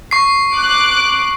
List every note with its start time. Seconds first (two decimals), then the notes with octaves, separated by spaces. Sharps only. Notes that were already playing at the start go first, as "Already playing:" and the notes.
0.11 C#6 C7
0.56 D6 F#6